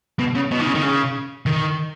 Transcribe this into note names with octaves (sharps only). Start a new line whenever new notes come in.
B2
C#3
B2
D#3
C#3
D#3
C#3
D#3